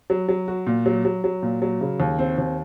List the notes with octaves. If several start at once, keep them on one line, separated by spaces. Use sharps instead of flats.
F#3
F#3
F#4
A#2
F#3
F#3
F#3
A#2
F#3
C#3
D#2
C4
D#2